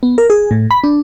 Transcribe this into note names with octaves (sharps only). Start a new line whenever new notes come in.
B3
A#4
G#4
A2
B5
D4